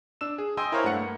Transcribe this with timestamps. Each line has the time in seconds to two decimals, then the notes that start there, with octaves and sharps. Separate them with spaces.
0.21 D4 E6 E7
0.38 G#4
0.57 D#5 G5 G#5 C6 D#6 E6
0.72 E4 A#4 C5 C#5 F5
0.84 G2 A3 F#5 C#7
0.97 A#3